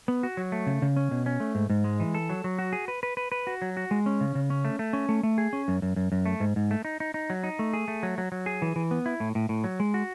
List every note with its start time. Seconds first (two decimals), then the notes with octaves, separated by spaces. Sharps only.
0.08 B3
0.23 F#4
0.37 F#3
0.52 A3
0.67 C#3
0.82 C#3
0.96 C#4
1.11 B2
1.26 C#4
1.40 A3
1.55 G#2
1.70 G#2
1.84 G#3
2.00 E3
2.14 A4
2.30 F#3
2.44 F#3
2.59 F#4
2.73 G#4
2.88 B4
3.03 B4
3.17 B4
3.32 B4
3.47 F#4
3.62 F#3
3.77 F#4
3.91 G#3
4.06 C#4
4.21 C#3
4.35 C#3
4.50 C#4
4.65 A3
4.79 A3
4.93 C#4
5.09 A3
5.23 A3
5.38 G#4
5.53 C#4
5.68 F#2
5.82 F#2
5.96 F#2
6.12 F#2
6.26 A3
6.40 G#2
6.56 G#2
6.71 A3
6.85 D#4
7.00 D#4
7.14 D#4
7.30 F#3
7.44 D#4
7.59 A3
7.73 G#4
7.88 A3
8.03 F#3
8.18 F#3
8.32 F#3
8.46 G#4
8.62 E3
8.76 E3
8.91 B3
9.06 E4
9.20 A2
9.35 A2
9.49 A2
9.64 F#3
9.80 G#3
9.94 F#4